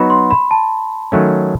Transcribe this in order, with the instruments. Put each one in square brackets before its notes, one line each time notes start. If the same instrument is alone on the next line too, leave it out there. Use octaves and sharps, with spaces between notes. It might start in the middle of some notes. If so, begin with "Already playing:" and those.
Already playing: [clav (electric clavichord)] F#3 B3 D#4 F#4 [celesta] B5
[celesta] C6
B5
A5
[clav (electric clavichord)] D#3 F#3 A3 C#4